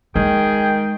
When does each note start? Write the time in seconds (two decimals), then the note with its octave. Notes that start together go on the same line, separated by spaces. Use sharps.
0.15 D#3 G#3 G#4 G5